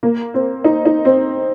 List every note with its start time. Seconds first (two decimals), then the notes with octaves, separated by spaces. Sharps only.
0.03 A#3
0.34 C4
0.64 D#4
0.85 D#4
1.05 C4